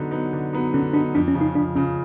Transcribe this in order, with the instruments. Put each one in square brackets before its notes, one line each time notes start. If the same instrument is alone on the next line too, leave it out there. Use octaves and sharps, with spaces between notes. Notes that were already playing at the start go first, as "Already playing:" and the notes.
Already playing: [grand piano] D3 F#3 B3 D#4
F#3 B3 D#4
D3
F#3 B3 D#4
[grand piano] D3 [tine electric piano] C#4
[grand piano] F#3 B3 D#4 [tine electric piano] D4
[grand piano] F2 [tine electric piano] D4
[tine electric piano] C#4
[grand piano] C#3 F3
[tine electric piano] D#4
[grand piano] F2 [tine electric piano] D4
[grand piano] C#3 F3 [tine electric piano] C#4